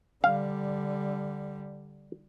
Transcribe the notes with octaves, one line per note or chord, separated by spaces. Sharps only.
D3 G3 F5